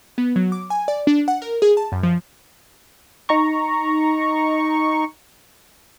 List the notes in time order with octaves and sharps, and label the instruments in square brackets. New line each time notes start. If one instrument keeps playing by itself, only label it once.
[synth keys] B3
F#3
D6
G#5
D5
D4
F#5
A#4
G#4
A5
F#2
F3
[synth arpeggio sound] D#4 A#5 C#6